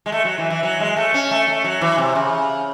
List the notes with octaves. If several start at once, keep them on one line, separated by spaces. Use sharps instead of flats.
G#3
A3
F#3
E3
E3
F#3
G#3
A3
C#4
A3
A3
F#3
E3
C3
C#3